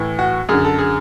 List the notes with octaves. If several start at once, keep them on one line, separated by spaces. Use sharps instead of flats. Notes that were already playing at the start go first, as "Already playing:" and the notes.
Already playing: A2 E3
F#4
F#2 D3 G#4
A4
G#4